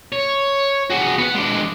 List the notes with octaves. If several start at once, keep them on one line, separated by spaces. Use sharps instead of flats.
C#5
F#4 G#4
B3 F#5
G#3 D4